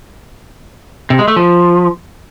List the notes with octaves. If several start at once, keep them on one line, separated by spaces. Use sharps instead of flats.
C3
G#3
A3
F3